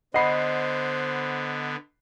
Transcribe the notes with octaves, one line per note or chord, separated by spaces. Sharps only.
D3 B3 C5 D#5 F#5 B5 C7